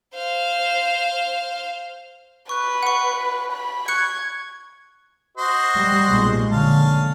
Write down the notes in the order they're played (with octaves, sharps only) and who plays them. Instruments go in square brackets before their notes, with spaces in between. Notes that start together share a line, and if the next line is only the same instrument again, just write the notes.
[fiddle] C5 F5
[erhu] B4 [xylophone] C#6 F#6
[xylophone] F#5 C#6
[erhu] B5
[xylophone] C#6 F#6 C#7 [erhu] G#6
[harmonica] F#4 C5 D#5
[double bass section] G3
B1 A#2 G#3
[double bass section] A#1 D3 [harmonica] C#4 F5 A5